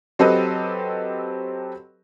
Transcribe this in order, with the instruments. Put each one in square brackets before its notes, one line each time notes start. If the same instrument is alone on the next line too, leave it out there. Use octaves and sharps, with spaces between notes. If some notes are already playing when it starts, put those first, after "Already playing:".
[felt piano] F#3 C4 G4 A4 B4 D#5